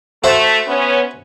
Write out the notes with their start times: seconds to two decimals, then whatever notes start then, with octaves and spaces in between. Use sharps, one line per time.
0.24 A3 F#4 C5 E5
0.67 B3 C#4